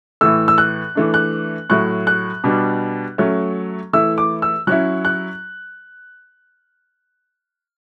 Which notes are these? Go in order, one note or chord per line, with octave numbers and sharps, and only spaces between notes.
A2 E3 A3 E6
E6
F#6
E3 A3 D4
F#6
A2 F#3 A3 F#6
F#6
B2 G3 D4
F#3 A3 C#4
E3 A3 E4 E6
D6
E6
F#3 C#4 E4 F#6
F#6